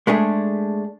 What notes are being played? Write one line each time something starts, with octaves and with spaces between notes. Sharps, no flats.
G#3 A3 D4 G#4